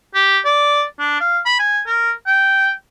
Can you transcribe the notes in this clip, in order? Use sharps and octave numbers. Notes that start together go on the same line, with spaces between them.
G4
D5
D4
F5
B5
G#5
A#4
G5